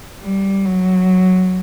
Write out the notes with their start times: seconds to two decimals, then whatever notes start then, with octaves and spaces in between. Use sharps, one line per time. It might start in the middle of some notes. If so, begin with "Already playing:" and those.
0.22 G3
0.66 F#3